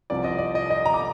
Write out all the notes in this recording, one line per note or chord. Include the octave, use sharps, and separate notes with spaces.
C2 C3 F3 C4 D5
D#5
D5
D#5
D#5
A#5
D6